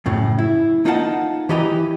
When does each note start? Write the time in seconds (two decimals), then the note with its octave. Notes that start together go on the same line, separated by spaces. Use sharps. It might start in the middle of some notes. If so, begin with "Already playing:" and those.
0.06 F#2 A2 C#3
0.39 E4
0.85 A#3 D#4 F4 D#5 F#5 A5
1.49 E3 E4 G4 D#5 A#5